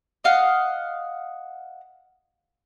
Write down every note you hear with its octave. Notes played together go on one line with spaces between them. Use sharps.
D#5 F5 F#5